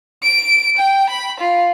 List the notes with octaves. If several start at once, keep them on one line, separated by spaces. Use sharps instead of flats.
D7
G5
B5
F4